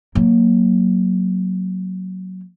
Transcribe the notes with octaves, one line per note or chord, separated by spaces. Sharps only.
F#3 A#3